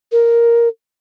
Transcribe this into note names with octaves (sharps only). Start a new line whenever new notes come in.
A#4